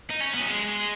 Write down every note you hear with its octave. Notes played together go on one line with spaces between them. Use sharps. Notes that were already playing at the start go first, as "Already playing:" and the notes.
D#4
C#4
B3
F#3
G#3